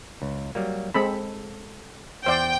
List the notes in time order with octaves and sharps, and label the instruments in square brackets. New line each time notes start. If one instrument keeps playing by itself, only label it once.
[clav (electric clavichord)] C#2
F#3 G3 A#3
[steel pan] G#3 C4 B5 [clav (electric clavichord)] A4
[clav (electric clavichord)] E2 [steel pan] C5 D5 [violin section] G5